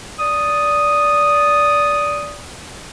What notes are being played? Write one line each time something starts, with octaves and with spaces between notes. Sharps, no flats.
D5 D#6